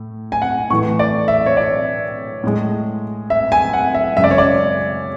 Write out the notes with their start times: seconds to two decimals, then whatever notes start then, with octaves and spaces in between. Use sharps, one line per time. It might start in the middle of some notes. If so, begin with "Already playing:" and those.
Already playing: A2
0.32 G#5
0.42 F#5
0.70 A2 E3 A3 C#6
0.99 D5
1.28 E5
1.46 C#5
1.57 D5
2.44 A2 G#3
3.30 E5
3.52 G#5
3.73 F#5
3.94 E5
4.17 F#2 C#3 G#3 E5
4.24 D5
4.31 C#5
4.38 D5